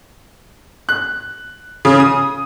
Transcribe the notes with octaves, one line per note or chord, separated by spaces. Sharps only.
F#6
C#3
D#6